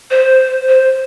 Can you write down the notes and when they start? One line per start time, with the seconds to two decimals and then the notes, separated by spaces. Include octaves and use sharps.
0.11 C5
0.68 C5